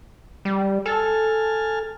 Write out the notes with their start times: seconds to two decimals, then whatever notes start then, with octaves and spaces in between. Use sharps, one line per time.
0.45 G3
0.86 A4 G#5 A5 F6